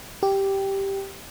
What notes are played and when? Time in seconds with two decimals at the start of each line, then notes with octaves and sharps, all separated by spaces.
0.23 G4